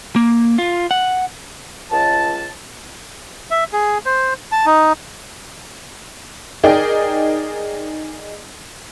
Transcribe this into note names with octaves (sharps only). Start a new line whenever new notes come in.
A#3
F4
F#5
C#2 A5
E5
G#4
C5
A5
D#4
D#4 G#4 A#4 D5 D#5 G5